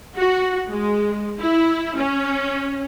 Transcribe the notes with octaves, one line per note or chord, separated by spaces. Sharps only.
F#4
G#3
E4
C#4